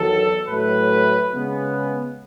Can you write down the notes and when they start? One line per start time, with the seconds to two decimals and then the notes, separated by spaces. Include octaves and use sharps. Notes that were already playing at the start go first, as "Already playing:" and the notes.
Already playing: E2 D#3 F#3 A4
0.47 A2 F#3 A3 B4
1.31 C#3 G#3 B3